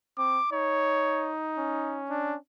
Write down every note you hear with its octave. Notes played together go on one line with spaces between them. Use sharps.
C4 D6
D#4 C#5
C#4
D4